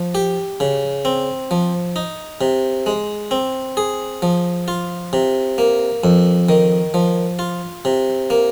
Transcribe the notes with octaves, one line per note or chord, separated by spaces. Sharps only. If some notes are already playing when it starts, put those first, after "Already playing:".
Already playing: F3
G4
C#3
C4
F3
D#4
C3
G#3
C4
G#4
F3
F4
C3
A#3
F2
D#3
F3
F4
C3
A#3